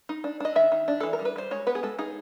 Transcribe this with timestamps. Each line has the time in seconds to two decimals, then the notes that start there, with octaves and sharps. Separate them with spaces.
0.09 D#4
0.24 D4
0.40 D4 D#5
0.56 D#3 E5
0.72 D#3
0.88 D4
1.00 E3 A4
1.13 A#4
1.19 G3
1.25 B4
1.36 G3 C5
1.51 G#3 C#5
1.67 B3 B4
1.75 G#4
1.83 G#3 A4
1.99 D#4 G#4